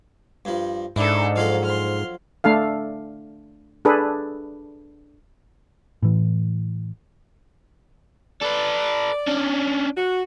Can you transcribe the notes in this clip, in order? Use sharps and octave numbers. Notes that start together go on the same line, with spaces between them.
G2 F3
G#2 D4 E4 A4
F3 F#3 A4 F5
C6 F6
A3 D4 A4 F5
D4 G#4 A4 B4
A2 E3
A4 B4 D5
C#4 D4
F#4